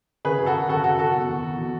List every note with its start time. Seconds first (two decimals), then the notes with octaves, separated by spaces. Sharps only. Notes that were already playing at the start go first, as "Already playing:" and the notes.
0.25 C#3 G#4 B4
0.40 F#2
0.46 F#4 A4
0.55 F#2
0.69 C#3 F#4 A4
0.84 F#2 F#4 A4
0.99 F#2 F#4 A4
1.14 B2
1.29 E2
1.44 E2
1.58 B2